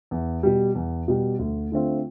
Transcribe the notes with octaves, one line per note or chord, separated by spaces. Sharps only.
E2
B2 G3
E2
B2 G3
D2
D3 A3 C4 F4